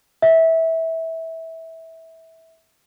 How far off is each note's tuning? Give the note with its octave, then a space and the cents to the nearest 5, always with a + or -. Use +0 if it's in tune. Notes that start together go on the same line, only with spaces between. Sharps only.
E5 -20